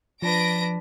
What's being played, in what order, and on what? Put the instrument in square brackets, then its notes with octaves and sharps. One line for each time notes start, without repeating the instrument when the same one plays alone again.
[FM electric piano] F3 [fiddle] D4 B4 [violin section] A#6 D7